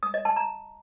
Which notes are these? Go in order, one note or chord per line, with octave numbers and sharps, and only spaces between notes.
D#6
D#5
A5
A#5